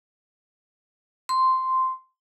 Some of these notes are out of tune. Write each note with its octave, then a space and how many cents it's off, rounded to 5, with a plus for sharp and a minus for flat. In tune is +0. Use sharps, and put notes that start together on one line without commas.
C6 -5